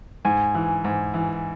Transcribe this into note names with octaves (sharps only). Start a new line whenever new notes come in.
G#2 G#5
E3
G#2
E3